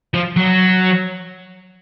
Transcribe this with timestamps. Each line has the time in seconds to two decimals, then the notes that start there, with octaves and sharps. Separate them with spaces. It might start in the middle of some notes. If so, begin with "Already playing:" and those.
0.14 F3
0.36 F#3